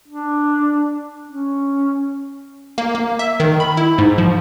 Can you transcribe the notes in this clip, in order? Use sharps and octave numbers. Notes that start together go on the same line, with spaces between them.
D4
C#4
A#3
A#3
E5
D#3
B5
E4
G#2
F3